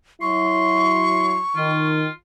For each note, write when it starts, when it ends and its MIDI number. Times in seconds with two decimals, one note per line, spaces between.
0.22 1.38 54
0.22 1.38 64
0.22 1.34 84
0.22 1.87 85
1.56 2.05 51
1.56 2.10 65